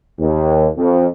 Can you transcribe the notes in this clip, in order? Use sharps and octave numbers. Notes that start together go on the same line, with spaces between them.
D#2
F2